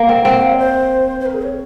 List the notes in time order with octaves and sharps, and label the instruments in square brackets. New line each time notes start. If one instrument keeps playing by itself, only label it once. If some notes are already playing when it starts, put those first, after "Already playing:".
Already playing: [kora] A#3
C4
[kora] C4 [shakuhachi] F#5
[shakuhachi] F5
C#5
C5
C5
A#4
G#4
C#5